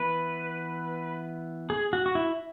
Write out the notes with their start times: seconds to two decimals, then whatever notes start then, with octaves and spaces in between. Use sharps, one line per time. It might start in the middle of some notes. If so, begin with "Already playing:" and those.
Already playing: E3 B3 B4
1.70 G#4
1.93 F#4
2.06 F#4
2.15 E4